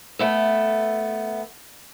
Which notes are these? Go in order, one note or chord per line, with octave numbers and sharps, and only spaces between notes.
A3 B3 A4